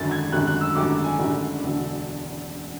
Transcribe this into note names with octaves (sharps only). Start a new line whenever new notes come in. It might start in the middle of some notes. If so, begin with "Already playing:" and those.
Already playing: G#1 F#2 D3 A6
G#6
G#1 F#2 D3 F#6
F#6
E6
G#1 F#2 D3 D6
G#5
G#1 F#2 D3
E1 D2 D3